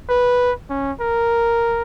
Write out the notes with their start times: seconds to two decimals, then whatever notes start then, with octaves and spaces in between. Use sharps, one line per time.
0.09 B4
0.70 C#4
1.00 A#4